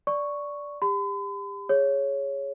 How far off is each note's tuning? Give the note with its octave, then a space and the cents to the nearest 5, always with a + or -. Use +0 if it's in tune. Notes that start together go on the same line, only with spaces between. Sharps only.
D5 -10 C#6 +0
G4 +30 B5 +45
G#4 +0 C#5 +0